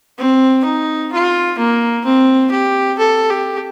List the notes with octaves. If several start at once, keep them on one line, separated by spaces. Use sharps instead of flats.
C4
D#4
F4
A#3
C4
G4
A4
G4